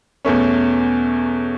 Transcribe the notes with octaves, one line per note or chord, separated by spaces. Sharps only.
E2 B2 A3 C#4